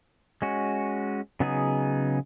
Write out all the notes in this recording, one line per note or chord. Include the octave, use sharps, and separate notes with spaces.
G#3 C#4 F#4
C#3 F#3 B3 D#4 G#4